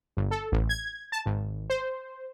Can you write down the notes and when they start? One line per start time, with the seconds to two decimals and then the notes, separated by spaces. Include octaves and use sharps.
0.17 G1
0.31 A4
0.52 A1
0.69 G#6
1.12 A5
1.26 G#1
1.70 C5